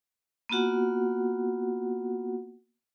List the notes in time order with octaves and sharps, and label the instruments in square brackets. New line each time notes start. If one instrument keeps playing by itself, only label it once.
[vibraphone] A#3 B3 F4 F#4 F#5